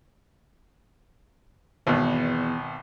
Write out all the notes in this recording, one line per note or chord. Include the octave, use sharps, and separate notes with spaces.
G#1 E2 B2